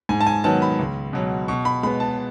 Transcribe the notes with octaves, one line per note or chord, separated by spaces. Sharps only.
G#2 G#5
A5
G#5
D#3 F#3 B3 A5
B5
C#2
B2 F#3
B2 C#6
B5
G#3 B3 B5
A5